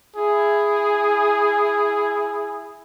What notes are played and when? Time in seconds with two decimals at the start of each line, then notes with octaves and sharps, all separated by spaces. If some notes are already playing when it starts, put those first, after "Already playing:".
0.17 E4 G#4